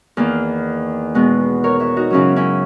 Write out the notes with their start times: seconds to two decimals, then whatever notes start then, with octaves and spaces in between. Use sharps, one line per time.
0.17 E2 D#3 A#3
1.15 B2 G#3 B3
1.64 A#4 C#5
1.80 C#5 E5
1.96 D#4 F#4
2.10 F#2 C#3 F#3 C#4 E4
2.36 C#4 E4